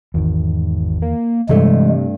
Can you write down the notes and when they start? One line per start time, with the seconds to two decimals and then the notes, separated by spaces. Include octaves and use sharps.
0.14 G#1 E2 D#3
1.02 A#3
1.49 G2 C3 E3 G#3 A3